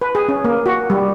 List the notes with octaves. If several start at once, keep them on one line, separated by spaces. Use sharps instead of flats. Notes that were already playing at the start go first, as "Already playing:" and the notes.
B4
G#4
C#4
A#3
F#4
G3